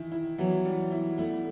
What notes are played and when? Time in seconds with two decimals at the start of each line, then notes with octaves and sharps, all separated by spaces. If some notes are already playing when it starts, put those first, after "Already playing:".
Already playing: D#3 E3 E4
0.12 E4
0.38 E3 F#3 B3
0.65 G3
0.92 E4
1.18 A3 B3 E4